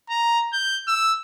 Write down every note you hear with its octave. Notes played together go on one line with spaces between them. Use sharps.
A#5
G6
E6